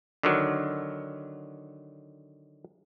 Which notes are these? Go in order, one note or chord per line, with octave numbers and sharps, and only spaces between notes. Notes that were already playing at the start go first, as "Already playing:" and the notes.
D3 D#3 F#3